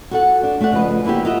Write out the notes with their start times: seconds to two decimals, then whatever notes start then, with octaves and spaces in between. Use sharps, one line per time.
0.11 F#4 A4 F#5
0.43 D4
0.60 A3 F#4 D5 F#5
0.72 C#3 F3 A4 B4 D#5
1.04 A#3 B3 E4 F#4 G4
1.25 F4 A#4 D#5 E5 F#5